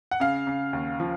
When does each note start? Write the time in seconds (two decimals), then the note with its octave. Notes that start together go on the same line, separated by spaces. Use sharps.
0.11 F#5
0.20 C#3 F5
0.47 C#3
0.73 D#2
1.00 F3